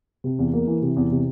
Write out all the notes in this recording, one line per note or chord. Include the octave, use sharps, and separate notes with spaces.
C3
E2
A#3
E3
C3
E2
C3